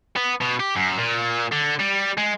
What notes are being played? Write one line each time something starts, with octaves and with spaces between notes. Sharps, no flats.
B3
B2
G4
F#2
A#2
D3
G3
G#3